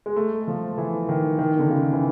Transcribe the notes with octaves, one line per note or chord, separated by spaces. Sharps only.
G#3
A3
F3
E3
D#3
D#3
D3
C#3
E3